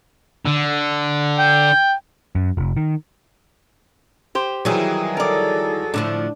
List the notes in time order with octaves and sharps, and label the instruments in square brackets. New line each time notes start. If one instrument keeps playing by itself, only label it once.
[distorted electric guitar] D3
[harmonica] G5
[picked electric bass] F#2
F1
D#3
[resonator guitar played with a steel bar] G4 C5
[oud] D#3 E3 G3 [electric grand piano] F#3 G#4
[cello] A4 [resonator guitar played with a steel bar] A#4 D5
[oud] A2 D3 F3 [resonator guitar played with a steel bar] D4